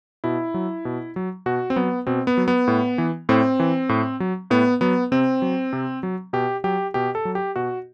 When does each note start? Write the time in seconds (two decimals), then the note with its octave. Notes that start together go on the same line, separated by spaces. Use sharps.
0.24 B2 E4
0.54 F#3
0.85 B2
1.16 F#3
1.46 B2 F#4
1.70 C4
1.76 F#3 B3
2.07 B2 C4
2.27 B3
2.37 F#3
2.48 B3
2.68 A2
2.98 E3
3.29 A2 C4
3.60 E3
3.89 A2
4.20 F#3
4.50 A2 B3
4.81 F#3 B3
5.12 C3 C4
5.42 F#3
5.73 C3
6.03 F#3
6.33 B2 G4
6.64 F#3 G4
6.94 B2 G4
7.15 A4
7.25 F#3
7.35 G4
7.56 B2 F#4